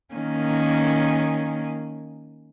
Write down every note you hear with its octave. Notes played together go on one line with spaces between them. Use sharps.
D#3 A#3 C#4